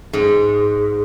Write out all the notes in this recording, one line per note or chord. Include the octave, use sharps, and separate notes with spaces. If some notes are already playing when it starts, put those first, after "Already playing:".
G#2